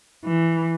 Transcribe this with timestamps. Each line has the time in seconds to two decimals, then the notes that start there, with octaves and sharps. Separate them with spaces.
0.25 E3